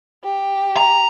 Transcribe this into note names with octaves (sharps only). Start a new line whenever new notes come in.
G4
A#5